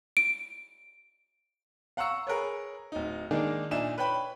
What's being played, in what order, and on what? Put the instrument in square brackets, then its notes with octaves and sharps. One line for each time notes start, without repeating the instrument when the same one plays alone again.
[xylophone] D7
[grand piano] F5 F#5 A#5 C#6 E6 C#7
G#4 A#4 B4 C#5
D1 D#4
D#3 G#3 A#3 D4 D#4 G#4
A#2 D4 D#4 E5 G#5 E7
B4 C#5 G5 B5